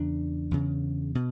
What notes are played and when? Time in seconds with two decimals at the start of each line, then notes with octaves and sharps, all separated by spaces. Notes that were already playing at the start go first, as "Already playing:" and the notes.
Already playing: E2 C#3 D4
0.51 E2 C#3
1.15 B2